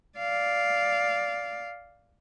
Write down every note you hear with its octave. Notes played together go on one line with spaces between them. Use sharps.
D5 F5